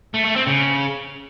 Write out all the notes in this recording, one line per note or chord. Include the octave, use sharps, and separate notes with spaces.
A3
A3
C4
C#3